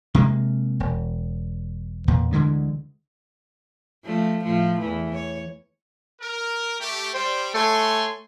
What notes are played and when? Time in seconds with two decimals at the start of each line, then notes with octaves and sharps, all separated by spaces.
0.15 C3 G#3 A#3
0.80 E1
2.08 E2 A#2
2.33 D2 D3 E3 G#3
4.05 F3 A3
4.43 A2 F3 A3
4.79 E2 E3
5.13 C#5
6.20 A#4
6.80 A3 G4
7.14 G3 C5 G5
7.54 A3 C#5 G#5 C6